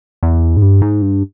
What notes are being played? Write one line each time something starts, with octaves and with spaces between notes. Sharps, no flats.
E2
G#2
G2
G#2
G2